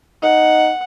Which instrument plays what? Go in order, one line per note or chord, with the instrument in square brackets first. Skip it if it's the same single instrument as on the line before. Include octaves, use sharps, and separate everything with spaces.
[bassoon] D#4 [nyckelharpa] F#5